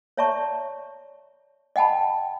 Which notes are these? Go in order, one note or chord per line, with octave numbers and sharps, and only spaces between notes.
C#5 D5 E5 A5 A#5 C#6
D#5 F#5 G5 A5 B5